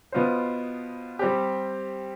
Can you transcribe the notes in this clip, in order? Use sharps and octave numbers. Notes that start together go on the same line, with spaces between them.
B2 B3 F4 C5
G3 C4 G4